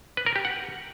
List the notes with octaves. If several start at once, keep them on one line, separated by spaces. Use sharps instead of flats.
B4
A#4
G4
F#5